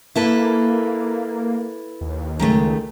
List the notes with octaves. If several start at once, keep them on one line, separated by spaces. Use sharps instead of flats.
A#3 E4 A4 B4
D#2
C#2 D#3 G#3 A3